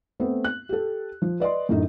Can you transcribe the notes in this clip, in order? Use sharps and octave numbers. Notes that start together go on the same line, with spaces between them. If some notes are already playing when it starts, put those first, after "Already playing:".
A3 B3 C4
F#6
G4 A4
F3
B4 D5 D#5 C6
F#2 A2 D3 D#4